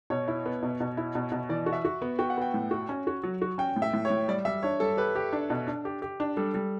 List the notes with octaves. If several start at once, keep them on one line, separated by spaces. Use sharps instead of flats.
B2 C#5
E4
B3
B2
B2
E4
B2
B2
E3 D5
F#4
E5
F#4
B3
F#4 G5
F#5
B3 G5
A2
F#4
C#4
F#4
F#3
F#4
C#4 G5
A2
E5
A2
C#5
A2
G3 D5
G3 E5
D4 C#5
G3 A4
G4 B4
G4
D4
B2
D4
G4
G4
D4
G3 A4
G3